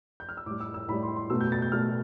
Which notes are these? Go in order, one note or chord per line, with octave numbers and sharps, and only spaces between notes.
G6
F6
E6
A2 G3 D6
E6
E6
A2 G3 B5
C6
C6
B2 A3 E6
G6
A6
G6
B2 A3 F6